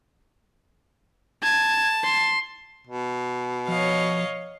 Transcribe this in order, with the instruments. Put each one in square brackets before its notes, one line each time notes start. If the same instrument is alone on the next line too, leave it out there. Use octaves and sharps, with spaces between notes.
[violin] A5 [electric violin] G#6
[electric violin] C6
[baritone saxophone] B2
[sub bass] F3 [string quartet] C#5 D#5 F5